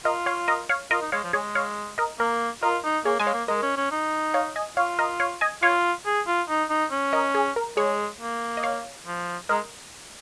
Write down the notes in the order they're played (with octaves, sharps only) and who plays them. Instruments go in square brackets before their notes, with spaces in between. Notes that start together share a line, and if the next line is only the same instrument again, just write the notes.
[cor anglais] F4 [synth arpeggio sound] A#4 D#5
[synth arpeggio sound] C#5 F5
A#4 D#5
C#5 F5
[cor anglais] F4 [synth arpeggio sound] A#4 D#5
[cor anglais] D#4
[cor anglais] G#3 [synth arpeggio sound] C#5 F5
[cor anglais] F3
[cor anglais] G#3 [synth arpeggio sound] G#4 C#5
[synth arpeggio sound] C#5 F5
A#4 D#5
[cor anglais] A#3 [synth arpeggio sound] A#4
[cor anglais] F4 [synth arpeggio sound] A#4 D#5
[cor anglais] D#4
[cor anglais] A#3 [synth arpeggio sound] G#4 C#5
[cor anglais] G#3 [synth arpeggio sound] G#5
[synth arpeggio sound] C#5 F5
[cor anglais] A#3
[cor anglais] G#3 [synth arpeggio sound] A#4 D#5
[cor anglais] C#4
C#4
D#4
[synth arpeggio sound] C#5 F5
D#5 G#5
[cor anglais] F4 [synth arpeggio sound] C#5 F5
[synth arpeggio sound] A#4 D#5
C#5 F5
D#5 G#5
[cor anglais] F4 [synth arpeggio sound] C#5 F5
[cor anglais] G#4
F4
D#4
D#4
C#4
[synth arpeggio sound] A#4 D#5
G#4
A#4
[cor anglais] G#3 [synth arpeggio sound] G#4 C#5
[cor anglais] A#3
[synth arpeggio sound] D#5
C#5 F5
[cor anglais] F3
[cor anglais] G#3 [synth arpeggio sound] A#4 D#5